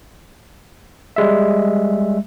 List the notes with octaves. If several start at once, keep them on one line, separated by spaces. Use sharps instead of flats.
G3 G#3 E5